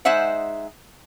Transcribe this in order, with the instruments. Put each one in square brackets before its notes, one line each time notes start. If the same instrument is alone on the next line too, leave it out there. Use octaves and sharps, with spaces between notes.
[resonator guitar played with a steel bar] G#3 D#4 C5 E5 F#5